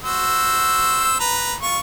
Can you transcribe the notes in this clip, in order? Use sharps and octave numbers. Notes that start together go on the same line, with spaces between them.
F#4 C5 E6
B4 A#5
F4 C#6